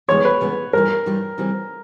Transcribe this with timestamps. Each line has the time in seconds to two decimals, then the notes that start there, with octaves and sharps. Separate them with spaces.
0.08 E2 C#3 E3 G#3 B3 C#5
0.25 B4
0.40 E2 C#3 E3 G#3 B3
0.73 G2 E3 G3 A#4
1.06 G2 E3 G3
1.38 C#3 E3 G3 C4